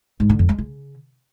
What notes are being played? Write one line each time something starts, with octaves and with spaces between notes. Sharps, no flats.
G#2
D3
F2
G#3
C#3